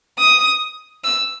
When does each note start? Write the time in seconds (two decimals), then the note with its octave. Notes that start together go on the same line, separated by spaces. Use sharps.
0.19 D#6
1.04 E6